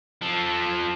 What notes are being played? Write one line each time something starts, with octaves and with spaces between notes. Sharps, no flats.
F3 A4